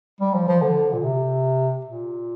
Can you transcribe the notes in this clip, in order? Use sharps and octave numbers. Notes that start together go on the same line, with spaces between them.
G3
F3
F3
D3
A#2
C3
A#2